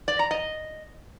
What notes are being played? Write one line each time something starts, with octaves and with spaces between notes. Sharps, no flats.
D5
A#5
D#5